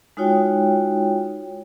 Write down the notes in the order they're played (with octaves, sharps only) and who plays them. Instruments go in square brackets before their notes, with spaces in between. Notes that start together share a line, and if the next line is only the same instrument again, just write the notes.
[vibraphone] G#3 D#4 F4 F#4 C#5 G5